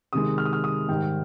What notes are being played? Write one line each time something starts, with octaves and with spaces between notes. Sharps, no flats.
C3 D#3 G#3 D#6
F6
D#6
F6
D#6
G#2 D#3 G3 G5